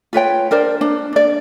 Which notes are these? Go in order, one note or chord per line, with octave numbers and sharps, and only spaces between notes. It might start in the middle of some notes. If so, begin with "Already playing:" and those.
F4 B4 C#5 G5
D4 A#4 C5 D5
D4
D4 D5